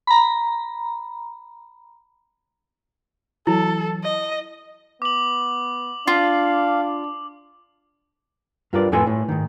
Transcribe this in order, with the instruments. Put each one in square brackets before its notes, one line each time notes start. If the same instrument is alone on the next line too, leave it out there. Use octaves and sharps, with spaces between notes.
[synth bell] A#5 B5
[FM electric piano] E3 F#3 [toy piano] E4 [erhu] A4
[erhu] D#5
[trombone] B3 [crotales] D6 F#7
[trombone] D4 [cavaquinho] F4 [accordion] F5
[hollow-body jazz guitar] G2 F4 A#4 B4 D5
F2 A2 A4 B4 G#5 C6
A2
G#2 D#3